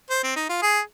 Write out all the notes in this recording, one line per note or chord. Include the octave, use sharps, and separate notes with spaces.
C5
C4
D#4
F4
G#4